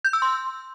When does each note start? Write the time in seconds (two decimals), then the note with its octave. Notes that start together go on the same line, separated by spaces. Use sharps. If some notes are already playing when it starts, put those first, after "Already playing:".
0.05 G6
0.13 E6
0.22 C6